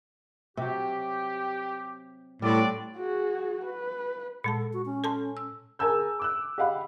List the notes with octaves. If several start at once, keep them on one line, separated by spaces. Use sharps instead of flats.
C3 F#3 G4
A2 G3 B3 C4 D4 D5
F#4 G#4
B4
A#2 G#3 A4 A5
F#4
C#4
A4 A5 C6
E6
G#4 A#4 G#5 A5 E6 G6
D6 E6 F#6
G4 D#5 F5 F#5 B5